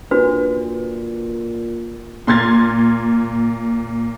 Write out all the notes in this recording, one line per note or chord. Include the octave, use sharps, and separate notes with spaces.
A#2 D4 F#4 B4
A#2 C6 F6 G#6 A6